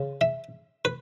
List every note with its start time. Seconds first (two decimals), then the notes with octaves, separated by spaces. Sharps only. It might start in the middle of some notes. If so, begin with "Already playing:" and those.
Already playing: C#3
0.21 E5
0.85 B4